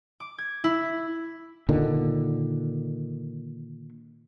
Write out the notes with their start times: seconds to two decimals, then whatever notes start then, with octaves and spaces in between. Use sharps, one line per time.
0.20 D6
0.38 G#6
0.64 E4
1.69 A#2 D3 D#3